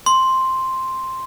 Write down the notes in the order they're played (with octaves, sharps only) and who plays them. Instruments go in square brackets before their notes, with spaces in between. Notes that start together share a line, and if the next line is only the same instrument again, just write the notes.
[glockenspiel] C6